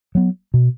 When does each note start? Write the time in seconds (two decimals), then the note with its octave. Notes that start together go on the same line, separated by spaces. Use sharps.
0.15 F#3 B3
0.54 B2